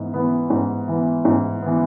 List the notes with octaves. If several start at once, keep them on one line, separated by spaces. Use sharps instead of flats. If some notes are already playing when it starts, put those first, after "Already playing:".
Already playing: G#2 E3 B3
E3 B3
G#2
E3 B3
G#2
E3 B3